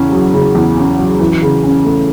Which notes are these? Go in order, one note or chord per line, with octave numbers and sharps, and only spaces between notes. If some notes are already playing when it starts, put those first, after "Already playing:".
Already playing: E2 C#3 C#4
F#3
C#3
E2
C#4
F#3
E3
C#3
C#4
A3